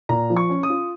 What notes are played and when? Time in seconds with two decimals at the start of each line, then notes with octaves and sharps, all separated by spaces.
0.09 A#2 A#5
0.30 F3
0.36 C#6
0.49 C#4
0.63 D#6
0.69 F4